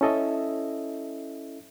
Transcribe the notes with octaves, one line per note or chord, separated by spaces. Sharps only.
C#4 E4 A4 D#5 E5